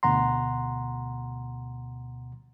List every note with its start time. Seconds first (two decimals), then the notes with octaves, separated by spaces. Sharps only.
0.03 D2 B2 F#5 A#5 C6